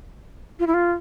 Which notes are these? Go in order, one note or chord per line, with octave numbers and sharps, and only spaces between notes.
F4
E4
F4